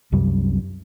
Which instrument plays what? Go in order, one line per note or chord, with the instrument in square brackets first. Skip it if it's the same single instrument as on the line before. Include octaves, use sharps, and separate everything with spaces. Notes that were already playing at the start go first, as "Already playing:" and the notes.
[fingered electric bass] C2 F#2 C3 G3